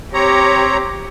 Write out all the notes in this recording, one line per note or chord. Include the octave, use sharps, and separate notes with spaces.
C4 G4 C#5 A#5